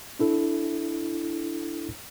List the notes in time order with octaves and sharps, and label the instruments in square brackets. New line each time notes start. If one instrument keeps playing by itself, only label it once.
[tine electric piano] D4 E4 A4